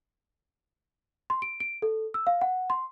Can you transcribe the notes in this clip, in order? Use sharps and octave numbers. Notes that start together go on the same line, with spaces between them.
C6
D7
D7
A4
E6
F5
F#5
C6